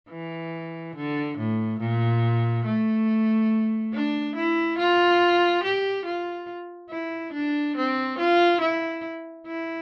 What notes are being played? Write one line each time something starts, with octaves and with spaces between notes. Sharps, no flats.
E3
D3
A2
A#2
A3
D4
E4
F4
G4
F4
E4
D4
C4
F4
E4
E4